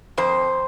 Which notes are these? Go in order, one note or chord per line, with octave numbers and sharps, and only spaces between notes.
F2 C5